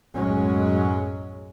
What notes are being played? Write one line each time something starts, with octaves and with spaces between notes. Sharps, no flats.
B1 F#2 A2 F#3 G#3 C#4